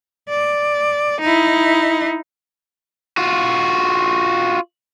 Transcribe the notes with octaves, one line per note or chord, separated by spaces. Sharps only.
D5
D#4 E4
F4 F#4